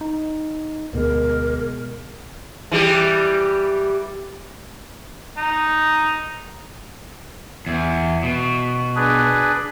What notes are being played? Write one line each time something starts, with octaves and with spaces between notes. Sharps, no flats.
D#4
D2 B2 G#3 A#4
E3 G3 G4
D#4
E2
B2
D4 G#4 B4